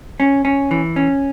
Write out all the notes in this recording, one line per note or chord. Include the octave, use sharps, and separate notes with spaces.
C#4
C#4
E3
C#4